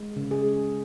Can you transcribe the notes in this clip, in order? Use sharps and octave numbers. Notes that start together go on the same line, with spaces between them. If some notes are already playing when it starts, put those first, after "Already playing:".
Already playing: G#3
C#3
G#4
G#3